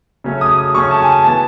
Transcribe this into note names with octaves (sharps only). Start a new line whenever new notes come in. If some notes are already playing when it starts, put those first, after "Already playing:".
C#3 F#3 A3 C#4
D#6
D#6
C#3 F#3 A3 C#4 C#6
A5
G#5
A5
E3 B3 A5